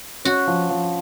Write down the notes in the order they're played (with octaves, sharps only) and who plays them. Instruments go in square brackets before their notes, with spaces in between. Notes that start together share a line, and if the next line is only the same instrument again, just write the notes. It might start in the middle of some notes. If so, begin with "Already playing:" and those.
[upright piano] C#4 [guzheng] F#4
[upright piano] F3
F3